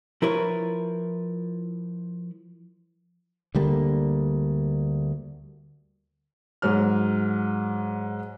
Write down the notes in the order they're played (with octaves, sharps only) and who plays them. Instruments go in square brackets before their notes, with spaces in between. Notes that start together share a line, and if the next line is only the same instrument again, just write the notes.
[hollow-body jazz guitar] F3 E4 A#4 B4 C#5
[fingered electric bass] D2 D3 G3 A#3
[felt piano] G#2 F#3 F6